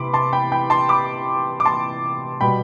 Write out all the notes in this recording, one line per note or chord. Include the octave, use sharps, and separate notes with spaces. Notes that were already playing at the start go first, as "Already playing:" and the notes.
Already playing: C3 E3 B5 C6 D6
A5 C6
G5 B5
G5 B5
A5 C6
B5 D6
D6
A5 C6
B2 G3 B3 G5 B5